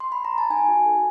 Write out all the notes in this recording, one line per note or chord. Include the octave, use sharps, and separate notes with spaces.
C6
B5
A#5
A5
D#4 G#5
F#4
A4